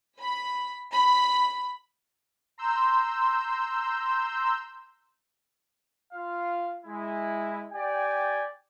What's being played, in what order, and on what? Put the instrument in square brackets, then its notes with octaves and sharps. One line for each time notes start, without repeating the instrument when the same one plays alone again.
[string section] B5
B5
[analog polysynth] A#5 C6 E6 G6
[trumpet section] F4 F5
G#3 E4
G4 D5 G5 G#5